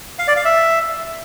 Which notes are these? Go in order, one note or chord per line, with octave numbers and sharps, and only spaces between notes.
F5
D5
F5
E5